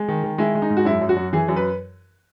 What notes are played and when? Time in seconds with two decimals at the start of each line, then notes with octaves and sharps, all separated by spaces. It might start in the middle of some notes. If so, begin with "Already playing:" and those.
Already playing: G#3
0.08 D#3
0.23 D#3
0.38 G#3 E4
0.55 G#3
0.62 D#4
0.70 G#2
0.77 F#4
0.85 F#2 E4
1.01 F#2
1.09 F#4
1.16 F#2
1.33 E3 G#4
1.48 F#2
1.56 B4